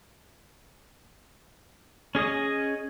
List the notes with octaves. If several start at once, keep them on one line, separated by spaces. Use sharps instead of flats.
C#4 G#4 D#5 D#6